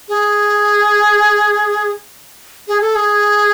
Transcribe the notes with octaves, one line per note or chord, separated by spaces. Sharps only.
G#4
G#4
A4
G#4